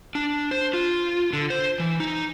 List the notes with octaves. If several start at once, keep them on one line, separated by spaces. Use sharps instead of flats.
D4
C5
F4
D3
C5
E3
D#4